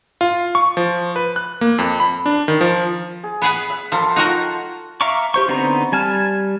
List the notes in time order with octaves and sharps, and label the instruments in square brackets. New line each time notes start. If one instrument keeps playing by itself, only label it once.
[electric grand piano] F4
C#6
F3
B4
F#6
A#3
F2
B5
D4
D#3
F3
[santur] G#4
[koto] B3 G#4 B4 [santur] F#5 B5
[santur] E5
[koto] F3 [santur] A4 A#4 C6
[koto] D#4 F#4 A#4 [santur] F4 F#5 G5
[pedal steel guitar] E5 F5 A#5 C#6 D6
G4 C5 C#6
D3 B3 C4 D#4 A#5
G3 G#5 A5 F6